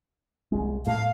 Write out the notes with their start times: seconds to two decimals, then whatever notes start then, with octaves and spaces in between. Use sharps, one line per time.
0.52 C2 G#3
0.86 A2 A3 F5